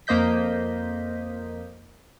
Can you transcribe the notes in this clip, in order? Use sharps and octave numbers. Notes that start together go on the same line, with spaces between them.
F2 A#3 C5 D#5 G6 B6